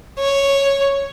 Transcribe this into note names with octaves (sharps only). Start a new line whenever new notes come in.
C#5